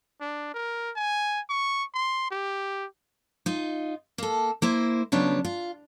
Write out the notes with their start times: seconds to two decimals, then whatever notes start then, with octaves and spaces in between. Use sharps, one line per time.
0.21 D4
0.54 A#4
0.96 G#5
1.50 C#6
1.94 C6
2.31 G4
3.46 D#4 F4
4.18 A#3 A4
4.62 A#3 E4 C5
5.12 C#3 F3 F#3 B3 D4 C#5
5.45 F4